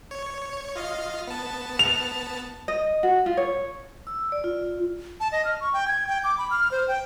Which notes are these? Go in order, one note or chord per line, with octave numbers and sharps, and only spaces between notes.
C#5
F4 D#5 F5
B3 A5
F7
D#5
F#4
F4
C#5
E6
D5
F4
A5
D#5
F6
C#6
G5
G#6
G5
D6
B5
F6
C5
G5